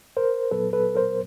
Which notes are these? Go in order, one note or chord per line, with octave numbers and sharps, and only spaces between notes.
A#4 C5
A#2 F#3 B3 A4 B4
A4 B4
A#4 C5